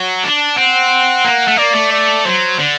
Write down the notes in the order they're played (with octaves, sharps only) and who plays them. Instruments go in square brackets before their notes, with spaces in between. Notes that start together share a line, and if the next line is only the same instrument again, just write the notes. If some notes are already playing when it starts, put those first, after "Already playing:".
Already playing: [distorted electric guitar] F#3
D4
[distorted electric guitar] C4 [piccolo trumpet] F#5
[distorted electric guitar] A#3
A3
[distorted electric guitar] A#3 [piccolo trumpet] D5
[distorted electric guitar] A3
[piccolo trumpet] D5
[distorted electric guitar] F#3 [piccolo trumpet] C5
[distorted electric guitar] D3